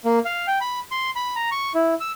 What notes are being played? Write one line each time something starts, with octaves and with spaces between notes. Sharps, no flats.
A#3
F5
G5
B5
C6
B5
A#5
C#6
E4
E6